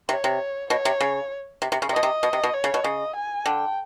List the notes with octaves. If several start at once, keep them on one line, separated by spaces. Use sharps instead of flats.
C3 C#5
C3
B2 C#5
C3
C#3
C3
C3
C#3
C3
B2 D#5
C3
B2
C3
B2
C#5
C#3
B2
C#3 D#5
G#5
D3 G5